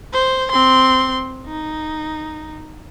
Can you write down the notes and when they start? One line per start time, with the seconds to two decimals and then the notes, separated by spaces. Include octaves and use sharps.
0.13 C5
0.52 C4 C6
1.46 D#4